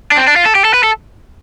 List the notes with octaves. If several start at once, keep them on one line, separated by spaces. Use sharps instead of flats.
D4
C4
D4
F4
A4
G4
A4
B4
A4